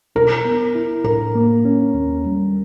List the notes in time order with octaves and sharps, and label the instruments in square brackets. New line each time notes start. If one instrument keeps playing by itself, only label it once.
[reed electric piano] B2 [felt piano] A#4
[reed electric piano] B3
E4
[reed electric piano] A2 [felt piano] A#4
[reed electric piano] A#3
C#4
D#2
G3